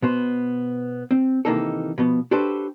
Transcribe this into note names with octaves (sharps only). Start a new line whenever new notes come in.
B2 B3 C5
C4
C3 D#3 E3 A#3 D#4 A4
B2 F3 B3
D4 F#4 G4 A4 B4 C5